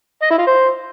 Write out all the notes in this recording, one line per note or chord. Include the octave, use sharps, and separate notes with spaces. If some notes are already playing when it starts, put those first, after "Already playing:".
D#5
E4
F4
C5